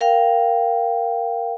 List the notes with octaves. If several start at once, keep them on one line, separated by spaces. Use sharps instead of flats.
A#4 F5 G5